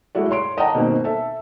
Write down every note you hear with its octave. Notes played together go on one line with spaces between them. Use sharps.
G#3 A3 E4 F#4 D5
C#5 C6 D7
D5 D#5 F#5 G5 A5 A#5
B2 D#3 A#3 C4
A4 E5